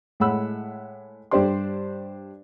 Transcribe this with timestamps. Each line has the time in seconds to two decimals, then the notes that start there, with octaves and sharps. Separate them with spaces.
0.20 A2 G#3 F#5 B5 E6
1.31 G2 D4 G4 C5 D5 C6